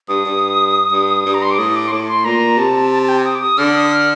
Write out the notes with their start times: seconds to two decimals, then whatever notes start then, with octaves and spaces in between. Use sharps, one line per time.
0.08 G2 D#6
0.26 G2
0.92 G2
1.26 G2
1.34 A#5
1.42 C6
1.51 D6
1.58 A2 D#6
1.76 D6
1.88 C6
1.92 A2 D6
2.08 C6
2.25 A#2 A#5
2.58 C3 A5
2.92 A5
3.03 A5
3.09 G5
3.25 D#6
3.35 D6
3.41 D#6
3.58 D3 F6
3.76 D#6
3.92 F6